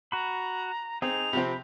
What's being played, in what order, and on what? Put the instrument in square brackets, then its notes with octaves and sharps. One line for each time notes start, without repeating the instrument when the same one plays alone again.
[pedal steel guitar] F#4 B5 [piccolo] A#5
[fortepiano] C4 [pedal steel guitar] D#4 G#4 [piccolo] F7
[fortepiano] C3 F3 C4 [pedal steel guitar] B5